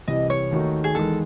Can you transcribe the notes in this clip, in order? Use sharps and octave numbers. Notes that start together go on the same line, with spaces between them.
C2 C3 E3 D#5
C#5
D#2 D#3 A3 D#4 F#4
G#4
E2 D#3 G#3 A4